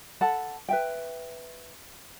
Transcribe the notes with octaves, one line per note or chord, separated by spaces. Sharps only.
A4 F#5 A5 B5
B4 E5 G5